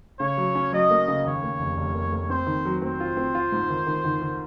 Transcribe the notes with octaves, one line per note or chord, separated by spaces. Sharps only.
C#3 C#5
F#3
C#4
F#3 D#5
A#3
C#3
D#2 C#5
A#3
F1
F1
A#3
A#3
C4 C5
D#3
F#3
C4 C5
F4
C4
F4
G#2
D#3
D#3
D#3
D#3